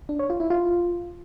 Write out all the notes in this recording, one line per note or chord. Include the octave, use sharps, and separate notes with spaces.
D4
C#5
F4
E4
F4